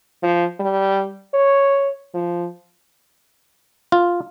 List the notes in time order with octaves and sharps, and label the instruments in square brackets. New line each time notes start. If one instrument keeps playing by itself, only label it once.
[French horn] F3
G3
C#5
F3
[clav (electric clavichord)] F4